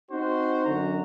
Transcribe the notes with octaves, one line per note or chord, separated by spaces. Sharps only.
C4 D#4 F#4 C5
F#2 D3 F#4 A#5